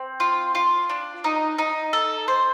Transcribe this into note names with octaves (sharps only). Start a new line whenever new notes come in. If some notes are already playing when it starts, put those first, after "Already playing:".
Already playing: C4
F4
F4
D4
D#4
D#4
A4
C5